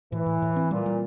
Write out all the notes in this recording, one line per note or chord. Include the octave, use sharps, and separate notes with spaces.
A2 E3
A2
A2
C4
A#2 G3
G3